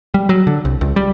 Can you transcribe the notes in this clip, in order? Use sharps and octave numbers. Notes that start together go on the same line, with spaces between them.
G3
F#3
D3
C2
C#2
G3